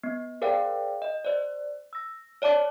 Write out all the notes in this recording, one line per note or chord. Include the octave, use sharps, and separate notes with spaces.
B3
G#4 A#4 C5 D5 F5 G5
D#5
C5 D5
E6 A#6
C#5 D5 A5 D6